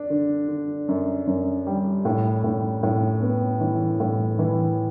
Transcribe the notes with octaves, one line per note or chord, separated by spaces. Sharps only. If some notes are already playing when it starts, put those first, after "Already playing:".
Already playing: D4
D3
D3
F#2
F#2
G3
A2
A2
A2
B3
E3
A2
E3